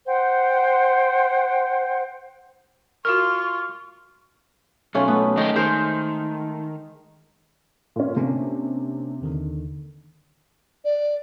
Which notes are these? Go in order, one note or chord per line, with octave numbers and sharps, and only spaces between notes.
C5 F#5 G5
F4 F#4 A#4 C#6 F6
B1 A3 C#4 F4
A3 B3
D#3 G#3 G4
D#3 G#3 A#4 C5
A#2 C#4
C3 A#3 C#4 D4
D#2 D3 D#3
D5